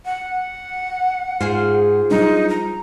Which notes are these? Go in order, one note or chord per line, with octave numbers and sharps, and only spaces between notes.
F#5
G#2 F4 G#4 C5
F#3 G3 D4 D#4
A#5